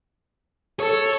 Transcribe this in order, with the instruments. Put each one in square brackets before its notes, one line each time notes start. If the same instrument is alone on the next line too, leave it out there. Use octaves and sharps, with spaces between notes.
[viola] A4 [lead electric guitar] C#5